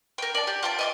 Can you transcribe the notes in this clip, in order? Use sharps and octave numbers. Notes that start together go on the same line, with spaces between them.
A#4 G5
D5 A5
G4
F4 G5 A5
D#5 E5 D6